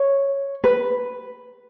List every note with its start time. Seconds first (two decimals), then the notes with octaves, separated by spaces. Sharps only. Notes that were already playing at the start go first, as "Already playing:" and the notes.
Already playing: C#5
0.64 B4